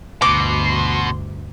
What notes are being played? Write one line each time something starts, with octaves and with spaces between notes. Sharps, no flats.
D2 G2 B2 C6 D6